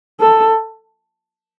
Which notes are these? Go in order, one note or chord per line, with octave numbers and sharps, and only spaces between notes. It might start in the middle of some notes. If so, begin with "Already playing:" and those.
A4